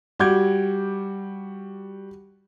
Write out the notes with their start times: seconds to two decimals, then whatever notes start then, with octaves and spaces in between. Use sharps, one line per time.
0.19 G3 F#4 D6 G6 G#6